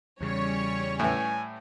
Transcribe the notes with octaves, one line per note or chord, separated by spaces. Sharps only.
E2 C#3 G3 C#4 C#5
A2 E3 G#5